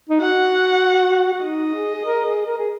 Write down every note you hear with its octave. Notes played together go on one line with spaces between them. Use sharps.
D#4
F#4 F#5
F#4
D#4 D#5
G#4
G#4
A#4
G#4
A#4
G#4